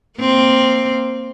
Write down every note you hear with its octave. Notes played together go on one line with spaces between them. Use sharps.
A#3 C4